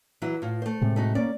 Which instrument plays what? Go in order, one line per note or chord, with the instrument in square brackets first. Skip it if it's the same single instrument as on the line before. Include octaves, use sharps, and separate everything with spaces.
[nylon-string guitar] E3 F#3 E4
A2 F4
A3 C5
[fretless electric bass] A2 C3 G#3
[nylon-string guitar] A3 D#4 F#4
[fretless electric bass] A#3 C#4 [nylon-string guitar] D5